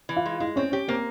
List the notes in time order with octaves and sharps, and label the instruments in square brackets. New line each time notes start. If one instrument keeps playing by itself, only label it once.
[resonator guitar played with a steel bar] E3
[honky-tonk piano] F4
[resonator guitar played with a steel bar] G#3
[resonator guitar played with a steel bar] G#3 [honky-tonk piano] E4
[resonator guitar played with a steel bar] C4 [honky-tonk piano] C#4
[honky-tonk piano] C#4 [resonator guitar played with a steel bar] G4
[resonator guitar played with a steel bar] A#3 [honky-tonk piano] C4